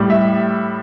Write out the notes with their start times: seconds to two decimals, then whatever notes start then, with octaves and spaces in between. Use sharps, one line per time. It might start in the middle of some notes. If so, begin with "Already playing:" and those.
Already playing: A2 G3
0.10 E5